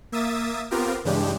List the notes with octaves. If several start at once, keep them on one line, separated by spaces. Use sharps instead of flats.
A#3 E5 D#6 A6
B3 C4 F4 G4 A#4
G2 C#3 E3 G#3 D4 G4